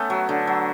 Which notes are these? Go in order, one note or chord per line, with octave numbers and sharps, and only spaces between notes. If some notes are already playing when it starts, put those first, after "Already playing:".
Already playing: A3 B3 C#4
F#3
D3
F#3